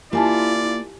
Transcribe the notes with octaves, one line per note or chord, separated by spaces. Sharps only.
A#3 E4 F4 G4 D5 G#5 A5